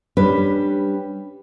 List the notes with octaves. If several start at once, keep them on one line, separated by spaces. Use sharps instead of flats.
G3 C#4 D4 B4